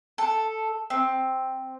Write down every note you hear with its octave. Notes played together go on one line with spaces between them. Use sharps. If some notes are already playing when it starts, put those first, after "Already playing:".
A4
C4